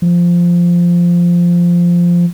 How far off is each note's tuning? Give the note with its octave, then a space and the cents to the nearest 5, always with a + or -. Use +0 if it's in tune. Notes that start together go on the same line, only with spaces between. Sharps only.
F3 -5